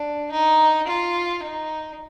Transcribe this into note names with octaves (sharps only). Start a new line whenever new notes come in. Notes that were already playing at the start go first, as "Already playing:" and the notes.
Already playing: D4
D#4
F4
D#4